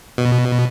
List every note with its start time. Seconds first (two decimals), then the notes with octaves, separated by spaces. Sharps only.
0.18 B2